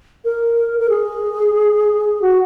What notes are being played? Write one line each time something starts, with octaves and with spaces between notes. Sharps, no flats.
A#4
A#4
G#4
F#4